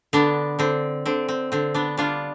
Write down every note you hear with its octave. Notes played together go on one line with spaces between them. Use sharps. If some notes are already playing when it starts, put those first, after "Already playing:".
D3 B3 D4
D3 C4
D3 C4
C4
D3 C4
B3 D4
G3 D4 F4